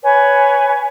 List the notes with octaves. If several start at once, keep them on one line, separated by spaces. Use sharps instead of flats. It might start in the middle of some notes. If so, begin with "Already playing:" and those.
B4 C#5 G#5